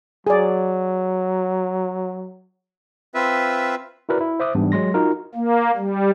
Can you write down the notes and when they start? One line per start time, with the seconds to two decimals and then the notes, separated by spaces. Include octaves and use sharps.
0.27 F#3 G#4 D5
3.15 C4 F4 B4 E5
4.09 E4 F#4 A#4 B4 D5
4.20 E4
4.40 C5 E5 D6 D#6 F#6
4.55 G#2 E3 G3 B3 D4
4.72 F#3 G#3 C6 A#6
4.94 D#4 F4 F#4 A#4
5.35 A#3
5.76 G3